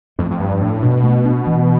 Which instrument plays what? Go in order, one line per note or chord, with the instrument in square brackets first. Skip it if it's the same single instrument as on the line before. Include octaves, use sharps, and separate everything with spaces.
[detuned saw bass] F2 [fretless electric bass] A3
[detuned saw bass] F2
[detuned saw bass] G2 [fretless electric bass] F3
[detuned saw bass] A2 [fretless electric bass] D4
[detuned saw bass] B2 [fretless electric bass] D4
[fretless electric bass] A3
D4
E3